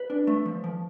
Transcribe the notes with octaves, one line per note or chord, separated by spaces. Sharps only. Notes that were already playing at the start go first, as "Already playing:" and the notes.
Already playing: B4
D4
A3
F3
F3